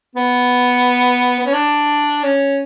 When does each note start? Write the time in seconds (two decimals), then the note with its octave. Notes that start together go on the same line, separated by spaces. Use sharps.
0.15 B3
1.39 B3
1.46 C#4
1.53 D4
2.23 C#4